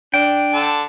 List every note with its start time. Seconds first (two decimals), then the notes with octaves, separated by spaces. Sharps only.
0.14 D4 G5
0.53 D3 A5